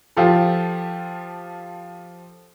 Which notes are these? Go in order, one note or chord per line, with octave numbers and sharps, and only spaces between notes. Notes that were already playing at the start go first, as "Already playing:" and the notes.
F3 F4 G4 A4